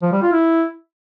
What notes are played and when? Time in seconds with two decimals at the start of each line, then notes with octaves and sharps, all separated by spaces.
0.03 F3
0.12 G3
0.22 F4
0.32 E4